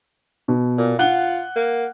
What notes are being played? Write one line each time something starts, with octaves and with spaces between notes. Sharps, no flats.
B2
A#2
F4 F#5 F#6 G7
A#3